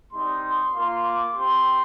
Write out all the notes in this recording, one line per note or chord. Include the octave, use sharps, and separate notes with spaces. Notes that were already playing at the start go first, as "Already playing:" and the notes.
G3 C4 D#4 C6
C6
A#3 F4 C6
D6
C4 G4 C6